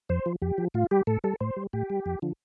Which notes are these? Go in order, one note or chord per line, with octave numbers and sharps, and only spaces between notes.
F2 C5
F3
F2 G4
F3
A2 F4
G3 G4
A2 A4
G3 A4
A2 C5
G3
A2 G4
G3
F2
D3 F3